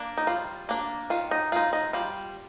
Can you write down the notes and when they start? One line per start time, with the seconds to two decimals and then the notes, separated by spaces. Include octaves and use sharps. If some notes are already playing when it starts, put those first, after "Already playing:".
Already playing: A#3 D4
0.17 D#4
0.27 G3 F4
0.69 A#3 D4
1.10 D#3 F4
1.31 D#4
1.52 G#3 D#4 F4
1.73 D#4
1.93 G3 F4